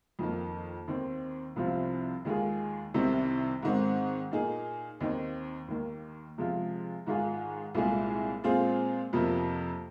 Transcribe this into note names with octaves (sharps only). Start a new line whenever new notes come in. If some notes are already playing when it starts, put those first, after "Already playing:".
F2 D#3 A#3
D#2 D#3 C4
C2 C3 F3 C4 F4
D#2 D#3 G#3 F4 G#4
C2 C3 D#3 C4
G#2 D#3 C4
A#2 A#3 D#4 G#4
D#2 D#3 C4 D#4
D#2 D#3 A#3
C3 F3 G#3 F4
G#2 D#3 G#3 F4 G#4
C2 A#2 G#3 F4 G#4
A#2 G#3 C4 F4 G#4
F2 C3 F3 A#3